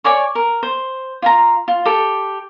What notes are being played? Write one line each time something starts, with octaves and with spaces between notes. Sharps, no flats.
C#5 D5 G#5 C#6
A#4
C5
F4 G#5 A#5
F4
G4 A4